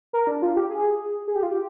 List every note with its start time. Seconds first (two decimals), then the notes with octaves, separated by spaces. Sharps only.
0.13 A#4
0.27 D4
0.42 F4
0.56 G4
0.70 G#4
1.28 G#4
1.36 G4
1.43 F4
1.51 G4